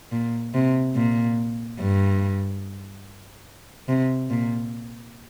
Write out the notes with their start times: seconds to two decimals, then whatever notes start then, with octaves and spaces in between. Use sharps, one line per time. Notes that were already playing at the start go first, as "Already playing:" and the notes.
0.12 A#2
0.54 C3
0.95 A#2
1.80 G2
3.88 C3
4.30 A#2